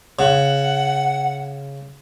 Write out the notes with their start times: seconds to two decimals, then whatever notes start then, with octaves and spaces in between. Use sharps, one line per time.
0.19 C#3 F#5